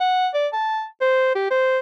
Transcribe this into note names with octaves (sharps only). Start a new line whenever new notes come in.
F#5
D5
A5
C5
G4
C5